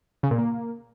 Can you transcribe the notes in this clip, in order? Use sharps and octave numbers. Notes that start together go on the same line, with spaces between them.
C#3
A#2
A#3